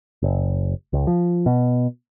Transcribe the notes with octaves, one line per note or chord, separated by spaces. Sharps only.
F#1
C#2
F3
B2